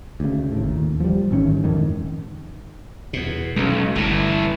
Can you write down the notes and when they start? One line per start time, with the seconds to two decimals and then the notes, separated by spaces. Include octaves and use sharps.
0.20 D2 C#3
0.52 G#1 A2
0.64 D#2
1.00 F3 G3
1.31 A1 G#2 D#3 C#4
1.64 D#1 F2 G#2 D#3
3.13 E2 B2
3.56 B1 G#3 C#4
3.96 G1 A2 D3 E3